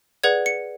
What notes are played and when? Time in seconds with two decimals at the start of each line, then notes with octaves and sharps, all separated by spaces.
0.24 G#4 B4 D5 F#5 G#6
0.46 C#7